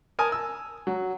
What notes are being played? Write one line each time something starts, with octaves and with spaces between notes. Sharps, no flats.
A#4 G#5 A5 D#6
E6
F#3